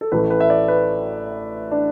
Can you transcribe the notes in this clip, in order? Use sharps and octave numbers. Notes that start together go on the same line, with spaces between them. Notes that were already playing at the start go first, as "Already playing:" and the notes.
A4
A1 A2 A3 B4
B4
E5
D5
B4
D4